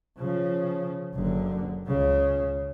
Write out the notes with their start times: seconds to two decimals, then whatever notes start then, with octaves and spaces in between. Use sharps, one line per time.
0.18 C#3 F3
1.14 F#1 D3
1.87 C#2 C#3